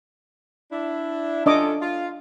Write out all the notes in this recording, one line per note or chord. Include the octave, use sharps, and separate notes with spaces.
D4 E4
C#4 D4 F4 A4 D#5 D6
F4